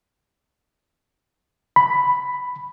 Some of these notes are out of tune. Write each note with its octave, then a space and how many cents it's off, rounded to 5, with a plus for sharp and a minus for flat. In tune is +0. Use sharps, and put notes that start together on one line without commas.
B5 +5